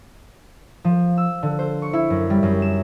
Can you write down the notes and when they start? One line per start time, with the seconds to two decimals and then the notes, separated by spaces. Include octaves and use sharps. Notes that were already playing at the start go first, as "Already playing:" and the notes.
0.84 F3
1.18 E6
1.43 D3
1.59 C5
1.82 C#6
1.93 E4
2.10 F#2
2.30 G3
2.43 F#2
2.62 E7